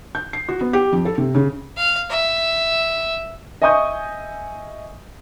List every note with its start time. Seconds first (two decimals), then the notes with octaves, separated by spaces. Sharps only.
0.15 G6
0.33 C7
0.49 F#4
0.61 B3
0.73 G4
0.92 F2
1.05 A4
1.18 C3
1.35 C#3
1.77 F5
2.10 E5
3.62 D#5 E5 G#5 C#6 D#6 G6